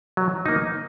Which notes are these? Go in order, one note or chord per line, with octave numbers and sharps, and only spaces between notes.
F#3
A#3 D#4